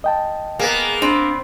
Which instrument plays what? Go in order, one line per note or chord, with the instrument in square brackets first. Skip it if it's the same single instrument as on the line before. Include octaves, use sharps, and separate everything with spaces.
[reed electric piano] D#5 G5 A5
[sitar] A#3 B3 [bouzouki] G#4 A#4
[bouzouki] C4 B4 [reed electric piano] D4